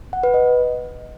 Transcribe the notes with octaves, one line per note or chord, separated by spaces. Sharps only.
F#5
B4
D#5